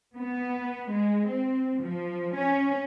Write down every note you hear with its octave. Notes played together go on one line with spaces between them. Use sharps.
B3
G#3
C4
F3
C#4